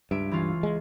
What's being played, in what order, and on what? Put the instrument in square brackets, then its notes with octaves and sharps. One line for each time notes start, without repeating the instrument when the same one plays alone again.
[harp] C#2 E5 D7 [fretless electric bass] G2
[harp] E3 C#4 F4
[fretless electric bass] G#3